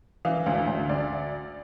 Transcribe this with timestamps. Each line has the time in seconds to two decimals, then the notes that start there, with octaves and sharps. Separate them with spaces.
0.25 E3 F5
0.46 D2
0.67 D2
0.89 D2 D5